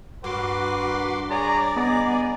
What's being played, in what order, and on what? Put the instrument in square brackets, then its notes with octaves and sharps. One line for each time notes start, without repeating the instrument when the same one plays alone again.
[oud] G2 [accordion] F#4 C6 D6 [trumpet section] A#4 B4 F#5
[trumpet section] G#4 C#5 A#5 [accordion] D5
[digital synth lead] B3 [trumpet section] G#4 D#5 A#5